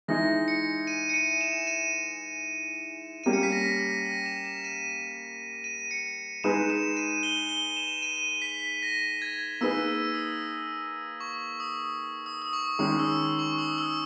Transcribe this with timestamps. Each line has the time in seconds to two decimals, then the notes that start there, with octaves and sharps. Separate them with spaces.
0.08 E3 G#3 D#4 A#6
0.48 C#7
0.87 D#7
1.09 C#7
1.14 D#7
1.41 E7
1.67 D#7
3.24 G3 A#3 C#4 G4 D#7
3.33 C#7
3.43 B6
3.52 A#6
3.79 A#6
4.05 A#6
4.26 E7
4.45 E7
4.64 D#7
5.64 D#7
5.91 C#7
6.44 G#3 D#4 G#4 B4 E7
6.70 E7
6.97 D#7
7.23 G7
7.49 G7
7.77 E7
8.02 D#7
8.42 B6
8.83 A#6
9.22 G#6
9.61 A#3 D#4 G#4 B4 E6
9.88 E6
10.14 D#6
11.21 C#6
11.60 D#6
12.26 D#6
12.42 D#6
12.53 C#6
12.79 D#3 G#3 C#4 D#6
12.99 E6
13.39 C#6
13.58 D#6
13.78 E6